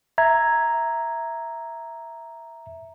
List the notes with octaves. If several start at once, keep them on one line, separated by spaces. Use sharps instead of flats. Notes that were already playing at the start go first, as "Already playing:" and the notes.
E5 A#5 G#6